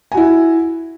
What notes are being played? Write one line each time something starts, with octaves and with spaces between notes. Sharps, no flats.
E4 F#4 G#5